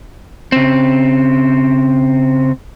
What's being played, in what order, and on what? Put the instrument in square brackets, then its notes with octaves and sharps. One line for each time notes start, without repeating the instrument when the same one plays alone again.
[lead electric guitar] C#3 C4